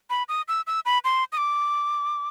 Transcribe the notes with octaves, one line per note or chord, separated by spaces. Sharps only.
B5
D#6
E6
E6
B5
C6
D#6
D6